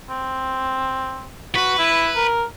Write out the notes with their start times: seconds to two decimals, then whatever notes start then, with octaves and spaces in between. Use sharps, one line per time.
0.10 C4
1.55 F#4 B4
1.79 E4
2.16 A#4